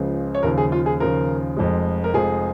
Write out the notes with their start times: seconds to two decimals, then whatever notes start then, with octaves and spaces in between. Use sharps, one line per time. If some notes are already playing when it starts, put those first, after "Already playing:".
Already playing: C#2 C#3 F3
0.35 C#5
0.43 D#2 C#3 F3 A#4
0.58 G#4
0.72 F4
0.86 G#4
1.00 D#2 C#3 F3 A#4
1.57 F1 F2 F3 G#3
2.04 A#4
2.13 F1 F2 F3 G#3 G#4